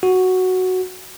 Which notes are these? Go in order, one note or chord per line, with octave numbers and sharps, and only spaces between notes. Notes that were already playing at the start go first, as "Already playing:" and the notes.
F#4